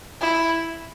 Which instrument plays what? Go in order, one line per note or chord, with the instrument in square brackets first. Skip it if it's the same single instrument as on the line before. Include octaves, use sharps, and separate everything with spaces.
[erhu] E4